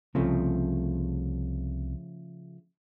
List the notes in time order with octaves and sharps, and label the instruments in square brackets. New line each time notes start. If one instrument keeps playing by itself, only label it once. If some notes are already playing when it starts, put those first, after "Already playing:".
[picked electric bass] C2 C4 [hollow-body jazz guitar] C#3 F3 A3